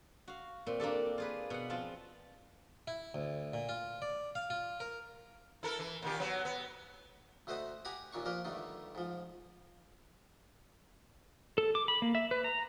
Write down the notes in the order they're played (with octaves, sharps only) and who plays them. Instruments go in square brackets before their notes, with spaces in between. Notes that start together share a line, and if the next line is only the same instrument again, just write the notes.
[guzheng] F#4 F5
A#2 C4
A#3 D4 G4 A4
F4 G#4 B4
B2 F#5
F3 C4 F4
[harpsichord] E4
D2
A#2
F4
D5
F5
F4
A#4
[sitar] E4 A4 A#4
E3
A#2 D#3 G4
F#3 B3
B3
[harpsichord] D2 A3 B4 C5 D#5 F#5
G4 F#5 G#5 A#5 B5 D#6
D#2 A#2 D4 C#6
F3 A#3 A#4 B4
G2 D3 D#3 A3
G#2 F3
[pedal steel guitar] A4
D6
B5
A#3
E5
B4
A#5